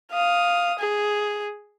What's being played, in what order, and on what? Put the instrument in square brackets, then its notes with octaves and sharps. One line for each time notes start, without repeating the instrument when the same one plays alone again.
[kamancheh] F5 D#6
G#4